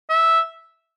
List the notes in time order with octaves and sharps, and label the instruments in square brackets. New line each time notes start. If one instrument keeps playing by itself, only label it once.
[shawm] E5